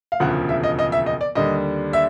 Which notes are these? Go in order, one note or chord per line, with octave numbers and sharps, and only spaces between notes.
F5
E1 D2 C#3 F3 F#5
E5
D#5
D#5
E5
D#5
D5
D#2 D3 G3 D#5
E5